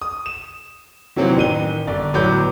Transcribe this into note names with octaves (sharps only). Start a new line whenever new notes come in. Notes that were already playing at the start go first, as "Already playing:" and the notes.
D#6
E7
C3 D#3 E3 F#3 A#3 C4
A1 D#3 D#7 G7
G1 D5
G1 A2 F#3 B3 D6 G6